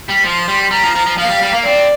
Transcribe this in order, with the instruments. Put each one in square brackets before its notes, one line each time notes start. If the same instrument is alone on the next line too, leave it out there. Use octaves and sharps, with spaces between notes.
[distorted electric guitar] G3
[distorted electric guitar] F3 [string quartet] C6
[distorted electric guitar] G3
[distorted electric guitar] G3 [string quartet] A#5
[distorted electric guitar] F3
F3
F3
[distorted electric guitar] F3 [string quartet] F5
[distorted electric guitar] A#3
G3
G3
A#3
[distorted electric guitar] C4 [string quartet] D5